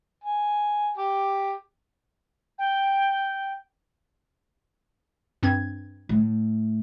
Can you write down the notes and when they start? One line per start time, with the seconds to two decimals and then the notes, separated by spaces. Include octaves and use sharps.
0.24 G#5
0.98 G4
2.58 G5
5.43 G2 C4 G#6
6.09 A2